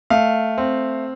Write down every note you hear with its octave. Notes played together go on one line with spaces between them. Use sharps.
A3 F5
C4